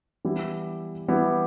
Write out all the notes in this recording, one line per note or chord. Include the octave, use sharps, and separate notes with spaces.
E3 G3 B3 E4 G4
E3 G3 B3 E4 G4